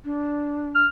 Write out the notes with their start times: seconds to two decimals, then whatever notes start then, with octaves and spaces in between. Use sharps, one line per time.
0.04 D4
0.75 F6